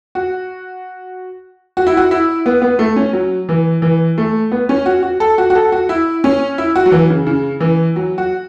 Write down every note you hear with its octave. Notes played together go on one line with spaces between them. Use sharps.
F#4
F#4
E4
F#4
E4
B3
B3
A3
C#4
F#3
E3
E3
A3
B3
C#4
F#4
F#4
A4
F#4
F#4
A4
F#4
E4
C#4
E4
F#4
F#3
E3
C#3
C#3
E3
F#3
F#4